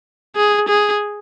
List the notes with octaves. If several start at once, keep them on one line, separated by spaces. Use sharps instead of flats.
G#4
G#4